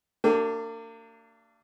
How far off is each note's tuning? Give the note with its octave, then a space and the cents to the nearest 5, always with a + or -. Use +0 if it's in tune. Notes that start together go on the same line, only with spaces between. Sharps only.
A#3 -40 D4 +0 G4 -30